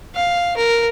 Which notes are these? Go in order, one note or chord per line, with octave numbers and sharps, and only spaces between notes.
F5
A#4